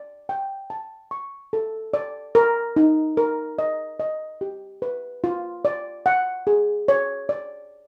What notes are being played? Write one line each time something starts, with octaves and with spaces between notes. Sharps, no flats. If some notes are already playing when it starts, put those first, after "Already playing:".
Already playing: D5
G5
A5
C#6
A4
D5
A#4
D#4
A#4
D#5
D#5
G4
B4
F4
D5
F#5
G#4
C#5
D5